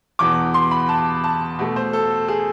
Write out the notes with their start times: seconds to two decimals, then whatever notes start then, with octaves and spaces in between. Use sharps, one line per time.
0.19 E2 B2 B3 D6
0.54 C6
0.71 B5
0.89 A5
1.24 A5
1.59 B2 A3
1.76 C5
1.93 A4
2.28 G#4